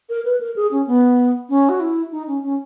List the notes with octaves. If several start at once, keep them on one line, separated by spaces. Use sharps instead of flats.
A#4
B4
A#4
G#4
C#4
B3
C#4
F#4
E4
D#4
C#4
C#4